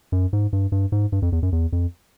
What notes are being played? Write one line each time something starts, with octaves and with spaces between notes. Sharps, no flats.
F#2
G#2
G2
G2
G#2
G2
F2
E2
F#2
E2
F2